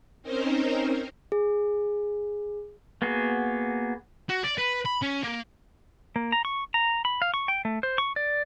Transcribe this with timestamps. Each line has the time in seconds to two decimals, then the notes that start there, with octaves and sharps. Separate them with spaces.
0.22 C4 C#4 D#4 A#4 C5
1.32 G#4
3.02 A#3 B3 F#4 G#4
4.29 F#4
4.44 D5
4.58 B4
4.86 B5
5.03 C#4
5.24 A#3
6.16 A#3
6.32 A#5
6.45 C#6
6.74 A#5
7.05 B5
7.22 F5
7.34 C#6
7.48 G5
7.65 A3
7.83 C5
7.98 C#6
8.16 D5